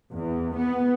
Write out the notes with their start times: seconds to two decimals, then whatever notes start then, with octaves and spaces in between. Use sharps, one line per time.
0.13 E2
0.58 B3